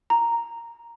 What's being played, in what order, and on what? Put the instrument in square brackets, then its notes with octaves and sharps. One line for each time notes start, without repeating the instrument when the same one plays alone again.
[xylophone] A#5